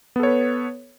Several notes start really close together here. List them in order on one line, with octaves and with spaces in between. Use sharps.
B3 A4 C#5 B4